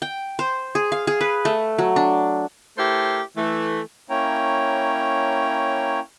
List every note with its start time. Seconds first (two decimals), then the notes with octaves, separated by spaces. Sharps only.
0.02 G5
0.39 C5
0.75 G#4
0.92 F5
1.07 G#4
1.21 B4
1.45 A3
1.78 F#3
1.96 D4
2.77 A3 E4 G4 A#4 C5
3.36 E3 A3
4.10 A#3 C#4 E4 C#5 G5 A#5